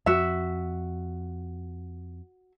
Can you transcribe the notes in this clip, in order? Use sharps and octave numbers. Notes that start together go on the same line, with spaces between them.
F2 F#4 E5